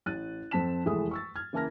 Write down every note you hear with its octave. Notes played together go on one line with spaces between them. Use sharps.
A1 F#6 A6 D#7
F2 C4 A5 B6 E7
F1 E2 E3 G#3 A3 D#6
C#6 E6 A6
F6 G#6
C#3 E3 A#3 A5 F6 A#6